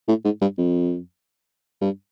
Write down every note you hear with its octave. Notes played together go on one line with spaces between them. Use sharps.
A2
G#2
G2
F2
G2